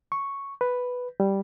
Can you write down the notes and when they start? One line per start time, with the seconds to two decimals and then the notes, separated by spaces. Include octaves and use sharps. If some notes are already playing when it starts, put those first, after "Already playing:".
0.12 C#6
0.61 B4
1.20 G3